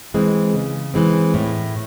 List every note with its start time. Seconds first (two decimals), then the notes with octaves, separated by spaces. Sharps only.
0.14 E3 G#3 C4
0.54 C#3
0.94 E3 G#3 C4
1.34 A2